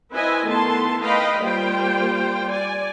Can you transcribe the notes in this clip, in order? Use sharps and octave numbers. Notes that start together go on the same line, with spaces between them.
C4 E4 B4 D#5 E5 G#5
D#3 A3 B3 E4 A5 C6
B4 D#5 F5 G5 B5
G3 A#3 F4 C5 G5
D5 G#5